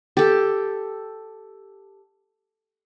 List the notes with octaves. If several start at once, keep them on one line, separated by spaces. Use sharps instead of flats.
G4 A4